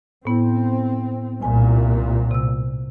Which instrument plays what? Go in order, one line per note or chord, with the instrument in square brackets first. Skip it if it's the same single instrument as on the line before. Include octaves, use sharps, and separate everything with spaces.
[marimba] A2 B3 E4 [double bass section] C4
[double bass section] C2 A#2 [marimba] G#5
[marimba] C3 E6